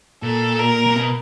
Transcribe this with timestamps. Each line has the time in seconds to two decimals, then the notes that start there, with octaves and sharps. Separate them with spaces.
0.23 A#2 A4
0.59 A#4
0.87 A#2
0.96 B2